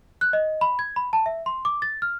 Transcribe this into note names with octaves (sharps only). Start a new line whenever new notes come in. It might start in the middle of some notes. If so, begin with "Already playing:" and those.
F#6
D#5
B5
G#6
B5
A5
E5
C6
D6
A6
F6